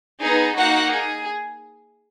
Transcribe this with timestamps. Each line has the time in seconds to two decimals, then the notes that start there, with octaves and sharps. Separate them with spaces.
0.21 B3 D#4 G#4
0.57 A#3 D#4 F#4 F#5
0.93 G#4